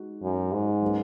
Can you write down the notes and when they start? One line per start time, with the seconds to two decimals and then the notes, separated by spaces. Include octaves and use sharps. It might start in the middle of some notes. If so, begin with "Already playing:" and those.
Already playing: G#3 D#4 F#4
0.22 F#2
0.52 G#2
0.81 F#3 A#3 C#4 G#4 B4